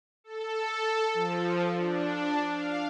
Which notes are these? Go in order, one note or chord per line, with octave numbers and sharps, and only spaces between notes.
A4
F3
D4
F5